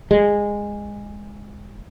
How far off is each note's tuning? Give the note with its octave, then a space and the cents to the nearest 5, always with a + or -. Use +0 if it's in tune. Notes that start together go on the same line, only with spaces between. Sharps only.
G#3 -15